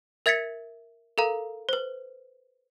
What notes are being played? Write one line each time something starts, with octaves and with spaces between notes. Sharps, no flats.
A#4 E5 G#6 A6 B6 C#7
A4 A#4 F5 A#5
B4 C5